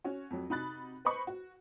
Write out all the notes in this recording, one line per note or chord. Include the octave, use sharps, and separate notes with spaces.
C#4 F#4
F2 F#3
C3 D#4 F#4 B5 F#6 A6
B4 C5 D#5 B5 C#6
F#4